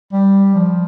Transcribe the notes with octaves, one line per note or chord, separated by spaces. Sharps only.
G3
F3